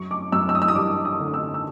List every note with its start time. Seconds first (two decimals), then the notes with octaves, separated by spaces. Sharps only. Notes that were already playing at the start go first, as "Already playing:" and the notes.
Already playing: F#2 C#6
0.11 D6
0.32 F#2 E6
0.49 E6
0.55 D#6
0.62 E6
0.68 D#6
0.75 G3 D6
1.05 D#6
1.20 D3
1.34 E6
1.54 E6